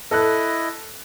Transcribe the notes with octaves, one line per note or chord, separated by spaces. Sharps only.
E4 A4 D#5 F#6